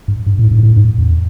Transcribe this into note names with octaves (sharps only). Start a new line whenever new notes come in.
G2
G2
A2
G2
A2
G2
E2